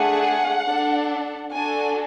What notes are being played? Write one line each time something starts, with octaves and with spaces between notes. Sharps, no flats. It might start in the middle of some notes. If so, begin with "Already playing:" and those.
Already playing: A3 D4 G#4 F#5
D4 A4
D4 F#4 A4 G#5